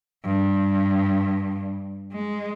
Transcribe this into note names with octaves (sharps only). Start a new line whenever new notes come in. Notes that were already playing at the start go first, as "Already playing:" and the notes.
G2
G#3